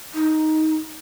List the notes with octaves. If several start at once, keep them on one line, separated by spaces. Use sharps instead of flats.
D#4